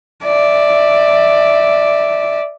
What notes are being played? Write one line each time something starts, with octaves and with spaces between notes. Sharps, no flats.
D5 E5